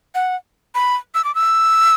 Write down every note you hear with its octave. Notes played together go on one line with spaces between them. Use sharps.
F#5
B5
E6
D6
E6